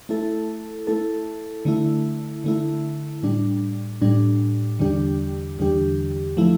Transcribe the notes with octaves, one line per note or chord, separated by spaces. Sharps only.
A3 E4 A4
A3 E4 A4
D3 A3 E4
D3 A3 E4
A2 G3 D4
A2 G3 D4
E2 D3 G3 D4 G4
E2 D3 G3 D4 G4
F3 A3 E4